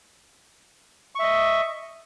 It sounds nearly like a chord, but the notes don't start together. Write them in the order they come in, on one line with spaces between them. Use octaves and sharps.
C#6 E5 D#5